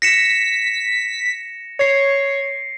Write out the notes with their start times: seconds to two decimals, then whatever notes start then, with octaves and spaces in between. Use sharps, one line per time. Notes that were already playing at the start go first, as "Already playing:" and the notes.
0.02 A#6 B6 C#7 E7
1.79 C#5 C7 C#7